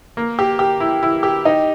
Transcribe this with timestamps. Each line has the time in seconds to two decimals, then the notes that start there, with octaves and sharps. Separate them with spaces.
0.17 A#3
0.39 G4
0.59 G4
0.80 E4
1.03 E4
1.23 G4
1.45 D#4